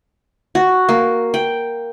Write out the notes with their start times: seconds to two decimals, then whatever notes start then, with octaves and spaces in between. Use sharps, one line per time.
0.55 F#4
0.89 A#3
1.34 G5